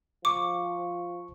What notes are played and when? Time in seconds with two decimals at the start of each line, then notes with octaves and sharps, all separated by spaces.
0.25 F3 C#6 D6